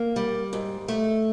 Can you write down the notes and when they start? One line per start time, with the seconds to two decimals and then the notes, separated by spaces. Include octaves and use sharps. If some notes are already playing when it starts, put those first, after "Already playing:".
Already playing: A#3
0.16 G3
0.53 G#2
0.88 A3